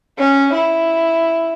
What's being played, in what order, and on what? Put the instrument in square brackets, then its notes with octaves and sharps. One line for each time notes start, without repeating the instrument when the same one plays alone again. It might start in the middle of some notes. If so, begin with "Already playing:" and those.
[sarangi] C#4
E4